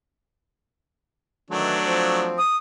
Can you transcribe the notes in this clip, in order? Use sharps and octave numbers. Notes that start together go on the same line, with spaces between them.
D#3 E3 F#3 A3 D4
F3 C4
D#6